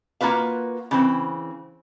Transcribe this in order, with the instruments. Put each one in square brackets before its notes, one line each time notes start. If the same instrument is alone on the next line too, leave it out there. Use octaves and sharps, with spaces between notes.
[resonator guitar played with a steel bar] A#3 F4 F#4 B4 F5
C#3 E3 C4